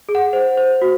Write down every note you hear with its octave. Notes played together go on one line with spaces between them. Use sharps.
G#4
F#5
C5
C5
F#4